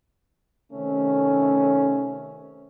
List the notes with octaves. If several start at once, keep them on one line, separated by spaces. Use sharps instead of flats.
C3 D#3 A3 C#4